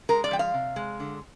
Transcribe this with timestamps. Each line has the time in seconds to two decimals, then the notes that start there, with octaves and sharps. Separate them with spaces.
0.09 G#3 A#4
0.24 D5
0.31 F3 G5
0.39 F5
0.54 C3
0.76 G#3
1.00 D3